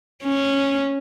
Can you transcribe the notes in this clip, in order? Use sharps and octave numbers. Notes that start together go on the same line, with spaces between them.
C#4